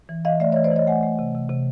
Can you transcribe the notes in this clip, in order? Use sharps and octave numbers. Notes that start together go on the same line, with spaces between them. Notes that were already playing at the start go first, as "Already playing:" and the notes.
E3
E3 D#5 F5
A3 D5 E5
C#5 D#5
E3
C5 D5
E3 C#5 D#5
A3 F#5 G#5
A3
C3
C3
C3